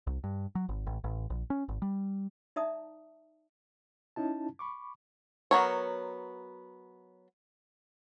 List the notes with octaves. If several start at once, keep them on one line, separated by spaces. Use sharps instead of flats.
C2
G2
F#3
G#1
A1
A1
A#1
C#4
G#1
G3
D#4 D5 E5 A5 A#5 D#6
C#4 D#4 E4 A5
B5 C#6 D6
F#3 B3 A#4 C#5